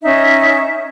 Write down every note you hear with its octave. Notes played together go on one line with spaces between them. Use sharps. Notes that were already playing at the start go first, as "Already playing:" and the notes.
C#4 D#4 E5